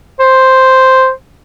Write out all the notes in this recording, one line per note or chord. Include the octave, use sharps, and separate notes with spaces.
C5